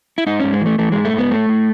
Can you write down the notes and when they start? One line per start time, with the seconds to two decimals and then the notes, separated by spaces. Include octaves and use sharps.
0.18 E4
0.27 G#2 D#4
0.40 G#2 C#4
0.52 G#3
0.61 E3 A3
0.79 E3 A3
0.92 G#2 G#3
1.05 A3
1.13 G#2
1.18 B3
1.31 A2 A3
1.49 A2